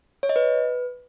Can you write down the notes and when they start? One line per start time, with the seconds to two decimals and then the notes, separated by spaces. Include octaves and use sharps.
0.23 C#5
0.29 D#5
0.36 B4